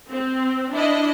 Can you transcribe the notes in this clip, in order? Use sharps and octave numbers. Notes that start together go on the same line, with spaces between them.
C4
D4 E4 D#5